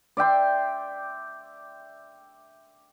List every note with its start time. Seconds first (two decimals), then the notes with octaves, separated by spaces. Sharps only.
0.17 D5 E5 G5 C6